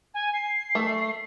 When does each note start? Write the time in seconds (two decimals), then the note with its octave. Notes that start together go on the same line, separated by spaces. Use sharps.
0.14 G#5
0.33 C7
0.75 A3